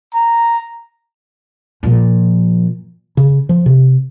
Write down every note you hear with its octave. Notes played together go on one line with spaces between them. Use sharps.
A#5
A#2 F3
C#3
F3
C3